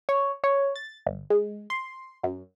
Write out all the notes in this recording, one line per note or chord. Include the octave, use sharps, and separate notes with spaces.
C#5
C#5
A6
G1
G#3
C6
F#2